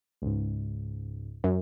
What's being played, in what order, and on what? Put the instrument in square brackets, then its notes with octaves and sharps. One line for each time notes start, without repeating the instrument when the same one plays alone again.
[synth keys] C#2 G#2
[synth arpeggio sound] F#2